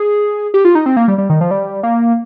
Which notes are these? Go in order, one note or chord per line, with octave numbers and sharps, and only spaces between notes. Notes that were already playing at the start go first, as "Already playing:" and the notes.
Already playing: G#4
G4
F4
D#4
C4
A#3
G3
G3
D#3
F3
G3
A#3